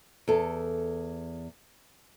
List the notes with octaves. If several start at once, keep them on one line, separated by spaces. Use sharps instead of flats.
E2 A4